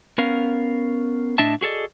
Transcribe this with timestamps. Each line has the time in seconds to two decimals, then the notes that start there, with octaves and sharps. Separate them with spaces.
0.18 B3 C#4 A#4 F5
1.38 A2 D4 D#5 E5 A5
1.61 F#4 G#4 A4 D5 D#5